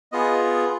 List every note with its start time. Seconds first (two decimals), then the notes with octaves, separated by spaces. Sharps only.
0.12 B3 F4 G#4 D#5